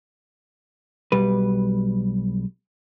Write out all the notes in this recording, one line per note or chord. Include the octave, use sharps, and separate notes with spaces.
B1 G3 B4